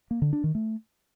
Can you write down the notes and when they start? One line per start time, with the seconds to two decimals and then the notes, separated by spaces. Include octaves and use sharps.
0.11 A#3
0.22 D3
0.33 D4
0.44 D#3
0.55 A3